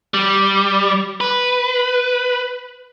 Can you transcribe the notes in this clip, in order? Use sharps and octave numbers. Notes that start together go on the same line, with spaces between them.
G3
B4